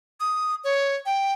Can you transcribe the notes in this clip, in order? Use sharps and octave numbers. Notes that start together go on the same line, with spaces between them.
D#6
C#5
G5